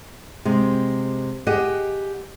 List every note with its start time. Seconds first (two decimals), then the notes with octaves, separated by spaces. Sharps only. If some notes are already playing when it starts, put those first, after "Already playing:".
0.45 C3 G#3
1.47 G4 G#4 D#5 F#5